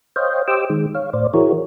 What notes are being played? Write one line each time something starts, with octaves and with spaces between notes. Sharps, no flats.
C5 C#5 D#5 F5 G5
G4 C5 D#5 G5 D6 E6
D#3 G#3
C#5 F5
A2 C5 D5
E3 E4 F#4 G#4 A#4 C#5